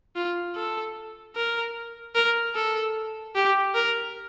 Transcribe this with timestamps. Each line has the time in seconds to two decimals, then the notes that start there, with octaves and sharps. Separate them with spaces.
0.16 F4
0.56 A4
1.36 A#4
2.15 A#4
2.55 A4
3.35 G4
3.75 A#4